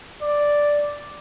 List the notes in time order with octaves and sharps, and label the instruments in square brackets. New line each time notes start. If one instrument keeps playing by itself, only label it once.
[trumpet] D5